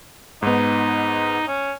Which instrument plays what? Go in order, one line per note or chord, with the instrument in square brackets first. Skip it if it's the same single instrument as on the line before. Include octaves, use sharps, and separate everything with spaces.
[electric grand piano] G#2 B3 [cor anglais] D#4
[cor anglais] C#4